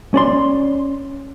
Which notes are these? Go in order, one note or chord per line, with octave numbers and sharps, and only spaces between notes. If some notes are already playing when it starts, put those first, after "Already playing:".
C#4 D5 C6